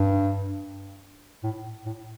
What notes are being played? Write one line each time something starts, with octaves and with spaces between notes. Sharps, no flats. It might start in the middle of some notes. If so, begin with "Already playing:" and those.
Already playing: G2
A2
A2